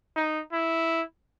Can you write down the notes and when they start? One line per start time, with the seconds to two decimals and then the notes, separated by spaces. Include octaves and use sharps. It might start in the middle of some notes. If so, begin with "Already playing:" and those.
0.16 D#4
0.52 E4